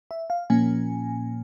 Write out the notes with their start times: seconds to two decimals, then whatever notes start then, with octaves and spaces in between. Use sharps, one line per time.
0.11 E5
0.30 F5
0.50 A#2 F3 A#3 C#4 G#5